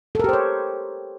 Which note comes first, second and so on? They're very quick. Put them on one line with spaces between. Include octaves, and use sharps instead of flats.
A4 A#4 G4 C5 C#5